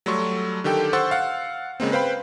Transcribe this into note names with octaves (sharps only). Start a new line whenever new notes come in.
F#3 G3 A3 A4 C6 C#6
D3 D#3 G4 A4 G5
C5 F#5 C6 C#6 E6 A6
F5 F#5
C#3 G#3 A#3 C4
B4 C5 F5 G5 B5